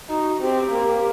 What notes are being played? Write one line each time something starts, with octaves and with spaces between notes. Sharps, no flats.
D#4 F#4
C4 G4
A#3